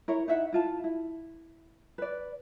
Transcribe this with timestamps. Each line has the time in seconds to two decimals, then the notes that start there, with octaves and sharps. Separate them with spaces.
0.08 E4 A#4 C#5
0.28 D#4 E4 E5 F#5
0.53 E4 F4 A5
0.84 E4
1.98 B4 D5